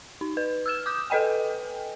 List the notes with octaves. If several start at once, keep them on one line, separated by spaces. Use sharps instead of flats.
D#4
B4
E6 F6 E7
D6 D#6 G6
A4 B4 D#5 G5 G#5